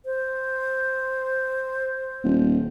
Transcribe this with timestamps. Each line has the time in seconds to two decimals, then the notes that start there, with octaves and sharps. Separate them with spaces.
0.05 C5
2.23 D#1